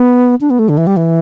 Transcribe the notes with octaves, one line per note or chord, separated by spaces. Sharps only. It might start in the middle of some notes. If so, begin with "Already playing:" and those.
Already playing: B3
D4
B3
A3
D3
E3
G3
E3